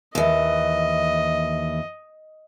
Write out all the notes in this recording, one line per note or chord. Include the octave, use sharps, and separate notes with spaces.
D#2 E3 D#5